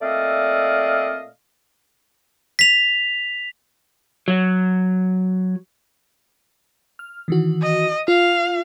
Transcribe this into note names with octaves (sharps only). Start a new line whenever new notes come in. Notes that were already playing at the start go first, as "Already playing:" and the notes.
A#2 A3 C4 D5 D#5 F5
B6 F7
F#3
F6
D#3 E3 F#4
D#5
F4 F5